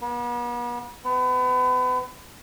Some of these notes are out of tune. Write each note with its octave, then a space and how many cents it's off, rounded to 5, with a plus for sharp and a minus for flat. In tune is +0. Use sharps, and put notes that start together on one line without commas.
B3 -40
B3 +35